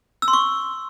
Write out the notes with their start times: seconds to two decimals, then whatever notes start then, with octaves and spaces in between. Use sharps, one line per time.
0.22 E6
0.28 C6
0.33 C#6